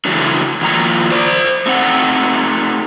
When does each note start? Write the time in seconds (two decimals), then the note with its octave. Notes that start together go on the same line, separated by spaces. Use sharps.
0.05 C#3 E3 F#3 G#3 A3 D4
0.61 D#3 F3 A#3 F4 A#5
1.11 C5 D5
1.66 A3 C4 D#4 F#5